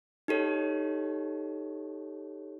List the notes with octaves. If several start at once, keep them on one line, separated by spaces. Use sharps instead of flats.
D#4 G4 A4 C#5